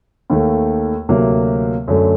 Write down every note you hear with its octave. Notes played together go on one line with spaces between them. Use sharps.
D#2 D#3 A3
D2 C3 F#3 A#3
F#2 D3 A3